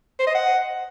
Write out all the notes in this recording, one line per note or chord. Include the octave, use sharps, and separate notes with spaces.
C5
D#5
F#5